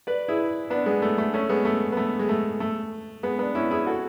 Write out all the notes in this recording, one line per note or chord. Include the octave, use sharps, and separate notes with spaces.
B4 D5
E4 G#4
B3 D4
G#3 B3
A3
A3
A3 C#4
G#3 B3
A3
B3
A3
G#3
A3
A3
G#3 B3
B3 D4
C#4 E4
E4 G#4
F#4 A4